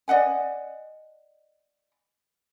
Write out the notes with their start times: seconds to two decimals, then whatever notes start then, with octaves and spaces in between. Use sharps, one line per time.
0.08 D5 D#5 F#5 G#5